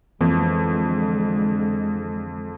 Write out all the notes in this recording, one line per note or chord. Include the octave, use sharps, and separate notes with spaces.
F2 D3 E3 G#3